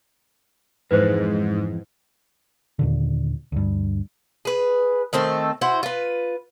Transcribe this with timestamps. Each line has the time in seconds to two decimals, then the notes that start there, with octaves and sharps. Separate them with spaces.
0.91 F2 G#2 E3 G#3 B4 C5
2.79 D#2 A#2 D3
3.52 D2 G2
4.45 G#4 B4
5.13 D#3 A3 C4 A4
5.61 E4 F#4 C5
5.83 F4 B4